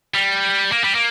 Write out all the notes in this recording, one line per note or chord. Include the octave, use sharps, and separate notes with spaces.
G3
A#3
G3
A#3